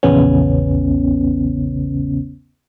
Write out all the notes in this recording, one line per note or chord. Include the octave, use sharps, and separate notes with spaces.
A#1 E2 C#3 B3 C#4